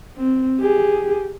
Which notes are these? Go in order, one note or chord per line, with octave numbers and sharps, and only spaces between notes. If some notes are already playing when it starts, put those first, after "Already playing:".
C4
G4 G#4